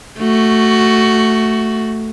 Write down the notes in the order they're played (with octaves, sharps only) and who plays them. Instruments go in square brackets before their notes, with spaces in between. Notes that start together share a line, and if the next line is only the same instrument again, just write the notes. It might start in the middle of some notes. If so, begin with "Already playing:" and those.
[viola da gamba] A3 F#4